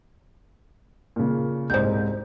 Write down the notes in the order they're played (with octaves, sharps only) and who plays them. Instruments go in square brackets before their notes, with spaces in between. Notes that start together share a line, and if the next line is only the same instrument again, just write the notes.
[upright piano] A#2 C#3
[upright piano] C2 G#2 [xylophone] C5 G6